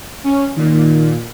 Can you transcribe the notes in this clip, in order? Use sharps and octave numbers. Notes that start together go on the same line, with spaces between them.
C#4
A#2 D#3